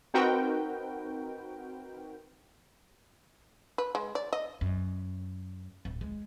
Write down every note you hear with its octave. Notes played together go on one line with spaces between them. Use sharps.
C4 D#4 F#4 A#4 B4 G5
B4
G#3
D5
D#5
F#2
D1
G#3